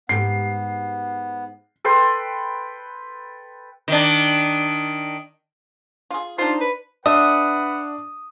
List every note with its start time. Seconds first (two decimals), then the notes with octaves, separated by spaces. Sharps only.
0.09 G#2 B3 G4 C7
1.84 A4 B4 G5 C6
3.88 D#3 D4
6.11 F4 G#4
6.38 D4 D#4 F4 C5
6.61 B4
7.06 D4 B4 E5 F#5 D#6